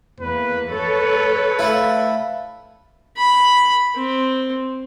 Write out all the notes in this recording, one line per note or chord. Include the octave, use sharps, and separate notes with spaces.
E2 A#3 B4
A4 B4 C#5
A3 E4 F5 B5
B5
C4